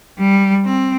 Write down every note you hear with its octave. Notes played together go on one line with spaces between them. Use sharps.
G3
C4